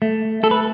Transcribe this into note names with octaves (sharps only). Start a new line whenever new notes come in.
A3
A3 A4
B4